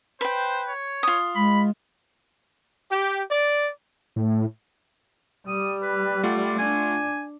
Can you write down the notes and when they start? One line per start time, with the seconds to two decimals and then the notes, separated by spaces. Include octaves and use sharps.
0.21 B4 C5 G5
0.68 C#5
1.03 F4 D#6
1.36 G#3 B5
2.91 G4
3.31 D5
4.16 A2
5.47 G3 D#6
5.82 B4
6.23 A3 F4 D5 F#5
6.59 D4 G#5